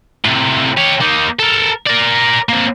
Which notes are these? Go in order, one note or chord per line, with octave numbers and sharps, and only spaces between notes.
A2 C3
G4 C#5
A#3 D#4
A4 A#4
A#4 D5
A#3 C4